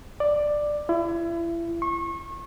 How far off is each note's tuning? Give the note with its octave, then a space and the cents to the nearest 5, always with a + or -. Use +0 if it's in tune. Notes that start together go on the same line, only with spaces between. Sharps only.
D5 +10
E4 +35
C#6 -30